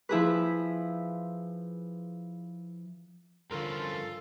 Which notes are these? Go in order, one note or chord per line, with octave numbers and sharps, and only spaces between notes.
F3 E4 G#4 B4
G2 D3 F3 C#4 F4 A4 A#4